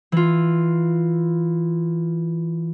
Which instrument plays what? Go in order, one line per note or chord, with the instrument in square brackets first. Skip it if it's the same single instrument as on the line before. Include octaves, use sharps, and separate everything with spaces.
[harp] E3 F4